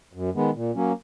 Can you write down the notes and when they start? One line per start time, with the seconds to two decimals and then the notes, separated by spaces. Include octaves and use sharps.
0.13 F#2
0.34 D#3 G#3 B3
0.55 A#2
0.75 F#3 A#3 C#4